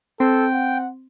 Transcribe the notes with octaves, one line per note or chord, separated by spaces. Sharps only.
C4 A4 G5
F#5